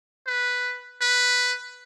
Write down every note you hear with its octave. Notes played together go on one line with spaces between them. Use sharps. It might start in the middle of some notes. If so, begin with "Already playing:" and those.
B4
B4